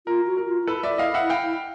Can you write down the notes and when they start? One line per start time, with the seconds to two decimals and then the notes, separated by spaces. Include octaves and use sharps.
0.07 F4 A#4
0.27 F#4
0.37 A#4
0.48 F4
0.63 F4
0.67 E4 A4 B4
0.83 D5 E5
0.98 D#5 F5
1.14 E5 F#5
1.30 F5 G5